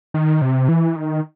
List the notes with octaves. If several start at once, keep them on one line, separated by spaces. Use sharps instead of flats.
D#3
C3
E3
D#3